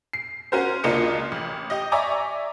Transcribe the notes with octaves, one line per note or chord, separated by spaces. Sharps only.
C7
C#4 F#4 A#4 C5
C#2 A#3 D4 F4 D#5 C#7
A1
G4 D#5
D5 E5 G#5 A#5 C#6 D6